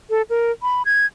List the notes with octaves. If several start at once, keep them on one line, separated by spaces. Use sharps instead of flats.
A4
A#4
B5
G#6